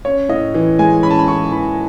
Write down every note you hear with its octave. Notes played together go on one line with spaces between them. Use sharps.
C#4 C#5
A2 D#5
E3
G#3 G#5
C#4 B5
A5
B5
A2 C#6
E3 B5